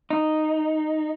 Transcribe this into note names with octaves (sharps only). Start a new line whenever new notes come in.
D#4